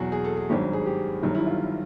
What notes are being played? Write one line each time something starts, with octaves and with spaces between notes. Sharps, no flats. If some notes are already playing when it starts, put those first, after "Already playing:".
Already playing: E2 B2 F#3 F#4
G#4
A4
G#4
G#1 G2 D#3 F#3 G4
G#4
G4
G1 G2 D#3 F#3
E4
F4